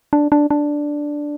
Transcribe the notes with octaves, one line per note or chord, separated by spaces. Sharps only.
D4
D4
D4